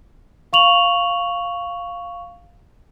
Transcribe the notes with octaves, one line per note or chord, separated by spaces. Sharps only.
F5 C#6 F7 F#7